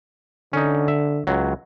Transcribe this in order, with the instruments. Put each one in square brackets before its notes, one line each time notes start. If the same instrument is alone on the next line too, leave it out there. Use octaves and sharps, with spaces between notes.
[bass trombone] D3 [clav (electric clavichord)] C#4 D#4
[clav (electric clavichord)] E5
C#2 F#3